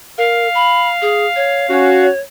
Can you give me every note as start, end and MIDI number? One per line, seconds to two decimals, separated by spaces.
0.18 0.48 70
0.18 2.06 77
0.55 0.89 83
1.02 1.26 68
1.36 1.68 73
1.70 2.07 61
1.70 2.07 66
1.70 2.20 73